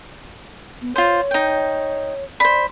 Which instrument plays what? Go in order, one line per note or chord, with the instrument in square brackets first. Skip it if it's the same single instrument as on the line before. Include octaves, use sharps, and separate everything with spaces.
[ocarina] B3
[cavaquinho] F4 C5 [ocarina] C#5
[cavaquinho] D#4 G5
[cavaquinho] C5 B5 [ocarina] D5